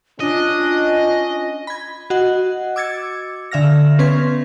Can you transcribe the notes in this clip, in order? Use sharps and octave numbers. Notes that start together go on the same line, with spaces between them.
C#4 D4 F4 D#5
B5 G#6
F#4 D#5 F#5
D6 E6 G#6 A6 C#7
D3 E5 F5 F6 A#6
B3 C#4 B4 C6 G#6